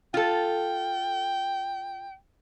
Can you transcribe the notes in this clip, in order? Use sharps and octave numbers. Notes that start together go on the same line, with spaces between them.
F4 A4 G5